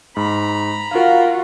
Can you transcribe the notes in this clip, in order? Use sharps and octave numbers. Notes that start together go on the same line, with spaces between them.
G#2 A#5 B5
F4 F#4 A#4 F5